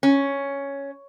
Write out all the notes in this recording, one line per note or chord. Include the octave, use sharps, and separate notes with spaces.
C#4